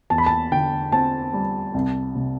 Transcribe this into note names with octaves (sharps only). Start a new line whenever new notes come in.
E2 A5
B5
A5
D3 G5
C4 A5
G3
C2
C3